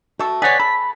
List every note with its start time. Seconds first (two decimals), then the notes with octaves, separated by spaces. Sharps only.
0.19 A3 F#4 A4
0.42 G#4 B4 C#5 D5 F#5 B6
0.60 A4 B5